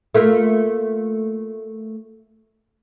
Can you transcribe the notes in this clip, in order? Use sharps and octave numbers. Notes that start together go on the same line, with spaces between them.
A3 A#3 F4